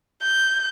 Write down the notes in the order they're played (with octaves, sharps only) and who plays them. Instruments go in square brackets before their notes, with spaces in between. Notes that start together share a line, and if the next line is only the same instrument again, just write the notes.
[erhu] G6